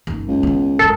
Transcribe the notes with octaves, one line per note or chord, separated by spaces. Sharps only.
F#1 D#4
C#2
D3 B3
F#2 G#3 A4